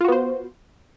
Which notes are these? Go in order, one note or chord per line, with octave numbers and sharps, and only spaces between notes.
B3 F4 F#4 C5